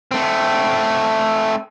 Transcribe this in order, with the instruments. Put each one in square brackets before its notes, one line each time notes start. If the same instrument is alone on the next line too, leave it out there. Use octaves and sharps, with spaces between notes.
[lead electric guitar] A3 C4